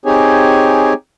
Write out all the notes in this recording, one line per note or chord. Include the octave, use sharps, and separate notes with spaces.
C4 D#4 G4 G#4 C#5 G#5